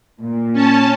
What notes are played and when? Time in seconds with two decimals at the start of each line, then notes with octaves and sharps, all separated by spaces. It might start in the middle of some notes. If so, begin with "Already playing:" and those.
0.22 A#2
0.53 C#4 A5